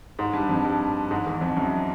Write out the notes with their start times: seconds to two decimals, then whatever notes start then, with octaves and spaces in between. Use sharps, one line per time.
0.19 G#2
0.33 G2
0.49 F2
0.65 G2
1.11 G#2
1.26 E2
1.41 F2
1.57 F#2